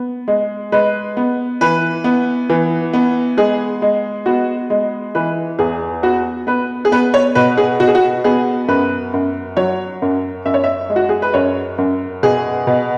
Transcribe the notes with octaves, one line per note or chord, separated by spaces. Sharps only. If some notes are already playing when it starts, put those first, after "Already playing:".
Already playing: B3
G#3
G#3 B4
B3
E3 B4
B3
E3
B3
G#3 G#4
G#3
B3 F#4
G#3
E3 B4
E2 G#4
B3 F#4
B3 B4
G#4
B3 B4
C#5
B2 B4
G#4
B2 F#4
G#4
F#4
B3 G#4
F#2 B4
F#2
F#3 C#5
F#2
F#2 E5
C#5
E5
G#3
F#4
G#4
B4
F#2 C#5
F#2
B2 G#4
B2